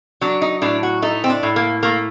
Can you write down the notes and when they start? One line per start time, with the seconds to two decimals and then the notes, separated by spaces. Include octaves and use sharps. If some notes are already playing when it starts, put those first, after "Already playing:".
0.21 F#3 D4
0.42 D#4
0.62 A2 D4
0.83 F#4
1.02 A3 D#4
1.24 C4
1.30 D4
1.43 A2
1.56 A#3
1.83 A3 A#3